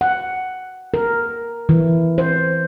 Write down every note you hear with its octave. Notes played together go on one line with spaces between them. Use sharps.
F#5
A#4
E3
C5